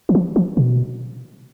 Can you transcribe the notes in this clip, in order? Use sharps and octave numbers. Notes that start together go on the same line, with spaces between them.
E3
F3
F3
B2